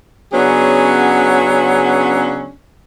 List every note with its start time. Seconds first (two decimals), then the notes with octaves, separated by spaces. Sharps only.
0.33 C#3 F#3 B3 C#4 D4 G#4